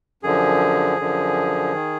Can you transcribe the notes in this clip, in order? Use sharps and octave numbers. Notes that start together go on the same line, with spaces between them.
F#2 D3 F3 G#4
F#2 D3 F3
D#3